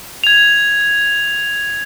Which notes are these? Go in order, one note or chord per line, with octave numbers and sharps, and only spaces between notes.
G#6 F7